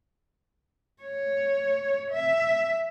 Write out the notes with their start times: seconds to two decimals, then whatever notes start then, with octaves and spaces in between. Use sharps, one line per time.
1.03 C#5
2.11 E5